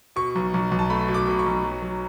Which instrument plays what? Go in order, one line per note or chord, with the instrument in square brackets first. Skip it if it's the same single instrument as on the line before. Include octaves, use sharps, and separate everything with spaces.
[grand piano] B2 C#6
B1
B1
B1
A5
A3 B5
B2
D6
B2
C#6
B1
F#3
F#3